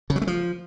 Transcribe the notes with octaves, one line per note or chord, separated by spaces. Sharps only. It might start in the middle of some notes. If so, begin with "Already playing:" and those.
C#3
F#3
A3
F3